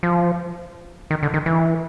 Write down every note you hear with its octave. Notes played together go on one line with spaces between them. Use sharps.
F3
D#3
D3
D#3
E3